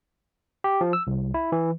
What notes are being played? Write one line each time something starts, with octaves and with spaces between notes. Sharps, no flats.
G4
F3
E6
C2
E4
E3